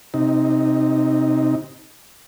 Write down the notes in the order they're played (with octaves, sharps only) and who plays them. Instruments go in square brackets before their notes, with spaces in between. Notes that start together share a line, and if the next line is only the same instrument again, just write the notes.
[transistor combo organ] C3 D#4